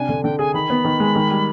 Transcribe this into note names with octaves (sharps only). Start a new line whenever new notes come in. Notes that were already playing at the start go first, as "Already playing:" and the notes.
Already playing: C3 D4 G#5
D3
D3 G5
G#4 G#5
D#3 B5
B3
D#3
G#3
D#3
G3